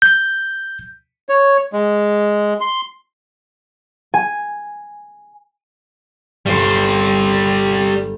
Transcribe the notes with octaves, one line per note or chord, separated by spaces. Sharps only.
G6
C#5
G#3
C6
G#5
G1 G2 G3 C5